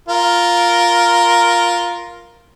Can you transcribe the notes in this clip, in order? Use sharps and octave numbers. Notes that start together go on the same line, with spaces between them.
F4 A#4